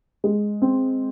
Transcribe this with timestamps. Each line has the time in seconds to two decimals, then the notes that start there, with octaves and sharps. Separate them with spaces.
0.24 G#3
0.62 C4